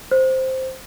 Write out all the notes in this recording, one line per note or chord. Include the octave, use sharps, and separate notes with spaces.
C5